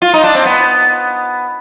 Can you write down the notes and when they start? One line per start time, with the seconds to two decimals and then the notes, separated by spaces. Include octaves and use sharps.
0.02 F4
0.13 D#4
0.23 D4
0.35 C4
0.45 B3